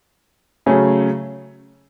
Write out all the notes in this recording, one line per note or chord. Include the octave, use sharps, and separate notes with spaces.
C#3 F#3 A3 C#4 G#4